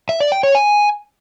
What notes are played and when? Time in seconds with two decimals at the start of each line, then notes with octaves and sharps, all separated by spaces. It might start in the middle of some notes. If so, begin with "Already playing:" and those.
0.09 E5
0.20 D5
0.32 G5
0.43 C#5
0.55 G#5